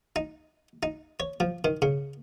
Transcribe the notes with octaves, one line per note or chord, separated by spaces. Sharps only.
D#4
D#4
C#5
F3
D#3
C#3